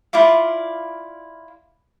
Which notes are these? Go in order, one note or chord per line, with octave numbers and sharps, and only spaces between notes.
E4 F4 D5 F5